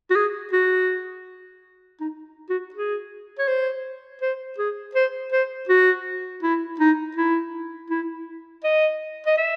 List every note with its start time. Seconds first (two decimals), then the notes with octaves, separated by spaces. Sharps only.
0.10 F#4
0.16 G#4
0.53 F#4
2.00 D#4
2.50 F#4
2.74 G#4
3.39 C#5
3.48 C5
4.21 C5
4.58 G#4
4.95 C5
5.32 C5
5.69 F#4
6.43 E4
6.80 D#4
7.16 E4
7.90 E4
8.64 D#5
9.26 D#5
9.38 E5